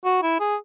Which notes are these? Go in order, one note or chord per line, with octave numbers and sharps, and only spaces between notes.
F#4
E4
G#4